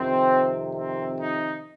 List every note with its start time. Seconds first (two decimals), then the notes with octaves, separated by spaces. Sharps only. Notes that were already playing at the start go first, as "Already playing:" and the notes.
Already playing: F2 C3 D#3 C4
0.76 C4
1.21 D#4